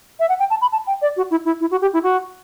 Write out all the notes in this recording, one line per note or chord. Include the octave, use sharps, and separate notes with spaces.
E5
F#5
G5
A5
B5
A5
G5
D5
F#4
E4
E4
E4
F#4
G4
E4
F#4